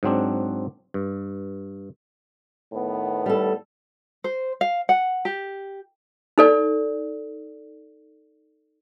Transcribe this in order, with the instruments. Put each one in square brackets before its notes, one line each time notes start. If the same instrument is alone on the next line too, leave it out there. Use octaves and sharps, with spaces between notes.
[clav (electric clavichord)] G#2 F#3 C4 D4
G2
[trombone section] A2 D#3 B3
[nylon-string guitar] G3 A4
[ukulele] C5
F5
F#5
G4
[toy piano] D#4 A4 D5